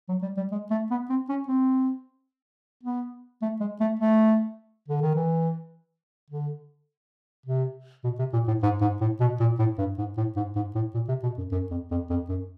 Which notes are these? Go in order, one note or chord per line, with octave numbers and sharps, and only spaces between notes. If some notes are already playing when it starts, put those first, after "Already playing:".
F#3
G3
G3
G#3
A3
B3
C4
C#4
C4
B3
A3
G#3
A3
A3
D3
D#3
E3
D3
C3
B2
C3
A#2
A2
G#2
G#2
A2
B2
A#2
A2
G2
G#2
A2
G#2
G#2
A2
A#2
C3
B2
F#2
F#2
F2
F2
F2
F#2